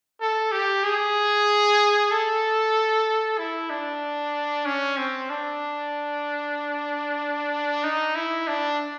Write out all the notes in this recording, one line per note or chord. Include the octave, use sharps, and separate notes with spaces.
A4
G4
G#4
A4
E4
D4
C#4
C4
D4
D#4
E4
D4